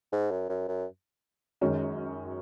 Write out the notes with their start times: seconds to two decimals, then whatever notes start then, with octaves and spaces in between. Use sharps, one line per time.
0.12 G#2
0.31 F#2
0.49 F#2
0.68 F#2
1.61 F#2 D#3 G#3 C#4 F#4